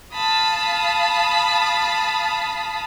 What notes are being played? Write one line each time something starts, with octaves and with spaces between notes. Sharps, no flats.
F5 A5 B5 D#6